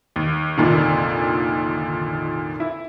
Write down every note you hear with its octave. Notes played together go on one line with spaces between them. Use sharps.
D#2
F1 A#1 A#2 D3 D#3
E4